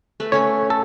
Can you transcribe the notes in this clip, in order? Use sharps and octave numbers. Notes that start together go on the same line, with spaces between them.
A3 B4
A3 C#4 C#5 B5
A4